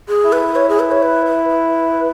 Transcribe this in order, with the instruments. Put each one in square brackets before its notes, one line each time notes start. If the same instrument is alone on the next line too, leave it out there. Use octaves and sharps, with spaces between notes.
[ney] G#4
[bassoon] E4
[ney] B4
C#5
G#4
B4
C#5
B4
B4
B4